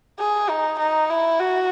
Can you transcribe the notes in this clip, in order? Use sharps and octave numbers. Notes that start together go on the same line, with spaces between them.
G#4
D#4
D#4
E4
F#4